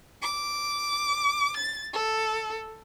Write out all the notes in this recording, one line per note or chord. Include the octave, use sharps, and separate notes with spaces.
D6
A6
A4